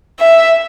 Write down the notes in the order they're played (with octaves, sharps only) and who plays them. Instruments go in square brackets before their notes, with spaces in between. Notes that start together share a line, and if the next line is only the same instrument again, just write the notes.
[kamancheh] E5